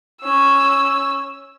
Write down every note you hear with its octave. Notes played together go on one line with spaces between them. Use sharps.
C#4 E6